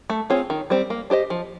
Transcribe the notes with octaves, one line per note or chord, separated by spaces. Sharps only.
A3
C4 F4 G#4 C#5
D#3
G3 C4
A#3
D4 G4 C5 D#5
F3